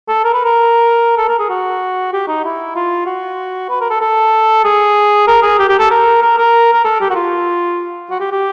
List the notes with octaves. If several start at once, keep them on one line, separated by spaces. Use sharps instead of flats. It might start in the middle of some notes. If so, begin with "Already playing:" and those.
A4
A#4
B4
A#4
A4
A#4
G#4
F#4
G4
D#4
E4
F4
F#4
B4
A#4
A4
A4
G#4
A#4
G#4
G4
G4
A4
A#4
A#4
A#4
A#4
A4
G4
F#4
F4
F#4
G4
G4